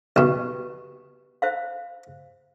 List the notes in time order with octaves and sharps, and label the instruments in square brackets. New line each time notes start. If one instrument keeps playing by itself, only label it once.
[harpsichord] B1 B2 [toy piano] G4 B4
[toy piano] C5 E5 F5